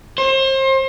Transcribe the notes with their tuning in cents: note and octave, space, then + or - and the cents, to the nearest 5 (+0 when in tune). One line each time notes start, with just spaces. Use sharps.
C5 +35